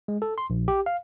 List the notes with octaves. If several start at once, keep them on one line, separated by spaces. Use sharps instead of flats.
G#3
A4
C6
A#1
G4
F5